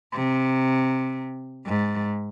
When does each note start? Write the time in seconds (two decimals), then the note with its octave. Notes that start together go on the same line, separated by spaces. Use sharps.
0.14 C3
1.66 G#2